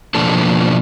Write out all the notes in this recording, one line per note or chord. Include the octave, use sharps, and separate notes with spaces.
B2 F3 A#3 D4 A4